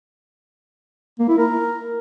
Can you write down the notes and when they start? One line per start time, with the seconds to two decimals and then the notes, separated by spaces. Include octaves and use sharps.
1.19 A#3
1.28 E4
1.38 A#4